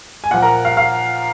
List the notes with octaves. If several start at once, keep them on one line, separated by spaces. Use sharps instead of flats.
G#5
A#2 F3 F#5
A#4 A#5
F5
F5